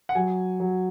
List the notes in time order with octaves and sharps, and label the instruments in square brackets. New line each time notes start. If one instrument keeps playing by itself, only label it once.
[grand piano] F#5
F#3 G#5
F#3